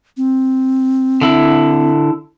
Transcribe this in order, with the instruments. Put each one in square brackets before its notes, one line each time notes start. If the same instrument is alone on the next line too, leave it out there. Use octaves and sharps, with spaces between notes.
[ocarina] C4
[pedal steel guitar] D3 E4